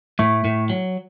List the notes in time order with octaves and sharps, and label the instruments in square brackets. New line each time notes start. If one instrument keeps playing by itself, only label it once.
[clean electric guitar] A2 [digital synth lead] A3
[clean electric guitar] A2
F#3